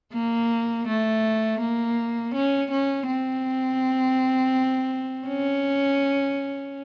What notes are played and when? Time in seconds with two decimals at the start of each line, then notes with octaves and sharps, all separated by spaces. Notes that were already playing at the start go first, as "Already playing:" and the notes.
0.13 A#3
0.88 A3
1.61 A#3
2.34 C#4
2.71 C#4
3.07 C4
5.28 C#4